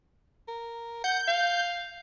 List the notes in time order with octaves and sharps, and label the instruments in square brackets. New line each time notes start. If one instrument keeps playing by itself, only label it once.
[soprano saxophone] A#4
[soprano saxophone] F#5 [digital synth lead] G6
[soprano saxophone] F5